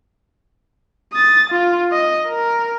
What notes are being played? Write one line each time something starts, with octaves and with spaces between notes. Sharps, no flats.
D#6 A6
F4
D#5
A#4